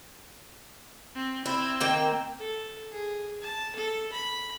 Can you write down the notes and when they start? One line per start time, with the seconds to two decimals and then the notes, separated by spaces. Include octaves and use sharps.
1.15 C4
1.46 C4 E4 E6
1.81 D#3 A#3 G5
2.38 A4
2.91 G#4
3.41 A5
3.76 A4
4.13 B5